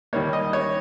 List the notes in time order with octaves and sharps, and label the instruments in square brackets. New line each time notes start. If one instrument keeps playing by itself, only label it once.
[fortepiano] D#2 D#3 G3 A#3 C#5
D#5
C#5